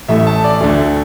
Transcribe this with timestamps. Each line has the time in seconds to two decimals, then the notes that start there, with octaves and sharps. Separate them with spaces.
0.08 A1 A2 A3 E5
0.27 A5
0.44 D5
0.60 D2 D3 A3